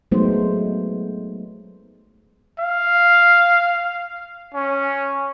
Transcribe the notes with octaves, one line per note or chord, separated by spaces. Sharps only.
F#3 G#3 A3 B3 D#4 C5
F5
C#4